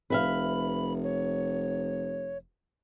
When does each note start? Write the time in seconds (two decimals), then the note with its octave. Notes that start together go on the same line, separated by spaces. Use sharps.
0.10 F1 B4 E5 F5 B5
1.03 C#5